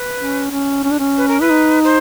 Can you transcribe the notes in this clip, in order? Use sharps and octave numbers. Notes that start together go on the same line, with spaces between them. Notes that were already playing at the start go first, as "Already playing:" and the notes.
Already playing: B4
C#4
C#4
C#4
D4
C#4
B4
A#4
E4 B4
D#4
C5